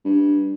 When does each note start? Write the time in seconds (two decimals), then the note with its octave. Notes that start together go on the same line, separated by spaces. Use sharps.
0.05 G2